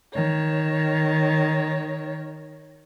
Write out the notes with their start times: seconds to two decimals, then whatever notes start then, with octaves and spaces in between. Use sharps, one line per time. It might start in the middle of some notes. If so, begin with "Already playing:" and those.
0.13 D#3 C#5